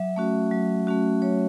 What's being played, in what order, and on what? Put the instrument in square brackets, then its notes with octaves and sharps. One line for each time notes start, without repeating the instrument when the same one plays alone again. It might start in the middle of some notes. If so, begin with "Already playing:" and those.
Already playing: [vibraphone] F#3 E5
A3 C#4 F#4
F#3
A3 C#4 F#4
F#3 C#5